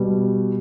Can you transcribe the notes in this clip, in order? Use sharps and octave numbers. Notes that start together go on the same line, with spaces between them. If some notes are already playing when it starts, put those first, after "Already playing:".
Already playing: B2 G3